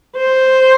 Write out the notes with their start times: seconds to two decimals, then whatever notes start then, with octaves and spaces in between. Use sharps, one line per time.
0.17 C5